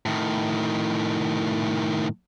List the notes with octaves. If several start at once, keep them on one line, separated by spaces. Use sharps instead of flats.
A2 D#3